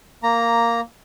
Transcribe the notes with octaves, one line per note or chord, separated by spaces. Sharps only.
A#3 A#5